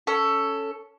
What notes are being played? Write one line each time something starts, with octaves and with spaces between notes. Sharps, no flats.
C#4 A4